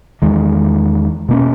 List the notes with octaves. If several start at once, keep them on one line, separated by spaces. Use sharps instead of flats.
E2 D#3 G#3
B2 A#3 C#4